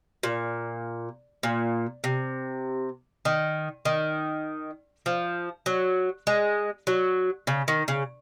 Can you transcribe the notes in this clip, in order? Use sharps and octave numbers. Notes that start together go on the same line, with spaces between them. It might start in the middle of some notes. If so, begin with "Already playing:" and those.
A#2
A#2
C3
D#3
D#3
F3
F#3
G#3
F#3
C#3
D#3
C#3